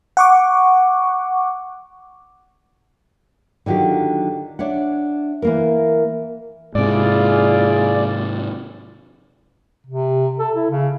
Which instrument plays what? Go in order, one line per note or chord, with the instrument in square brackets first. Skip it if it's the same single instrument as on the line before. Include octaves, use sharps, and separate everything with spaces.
[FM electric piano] F#5 C#6 D6
[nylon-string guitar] D3 D#3 F#3 F4 G4
D4 C#5 E5 F#5
E3 A#3 A#4
[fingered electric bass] G#2 C3 [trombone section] E4 F4 G#4 [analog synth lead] D5
[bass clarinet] C3
A4
E4
C#3